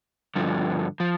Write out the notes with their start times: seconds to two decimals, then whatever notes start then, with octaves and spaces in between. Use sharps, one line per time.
0.36 G2 D3 F3
1.00 F3